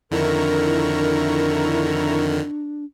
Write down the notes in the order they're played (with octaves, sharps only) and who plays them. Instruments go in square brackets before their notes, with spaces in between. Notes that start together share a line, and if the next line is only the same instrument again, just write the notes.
[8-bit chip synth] F2 D3 D#3 [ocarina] D4 [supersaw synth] E4 A#5 C#6 [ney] A#4